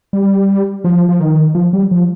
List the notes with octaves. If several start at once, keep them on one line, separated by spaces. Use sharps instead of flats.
G3
F3
F3
D#3
F3
G3
F3